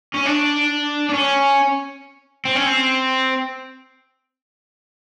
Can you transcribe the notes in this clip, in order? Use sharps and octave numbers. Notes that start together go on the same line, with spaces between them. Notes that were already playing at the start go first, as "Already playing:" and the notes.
C#4
D4
D4
C#4
C4
C#4
C4